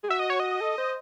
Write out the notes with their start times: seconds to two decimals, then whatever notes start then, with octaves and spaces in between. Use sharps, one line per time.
0.03 G#4
0.09 F#4 E5
0.19 D#5
0.30 C#5
0.40 D#5
0.61 A4
0.78 C5